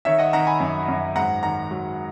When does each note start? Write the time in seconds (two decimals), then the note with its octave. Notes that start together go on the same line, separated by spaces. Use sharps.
0.05 D#3 C#5 E5
0.19 D#5 F#5
0.33 D#3 F#5 A#5
0.47 G#5 B5
0.60 F#2
0.88 F#2
1.16 G#2 F#5 A#5
1.43 D#3 F#5 A#5
1.71 F#3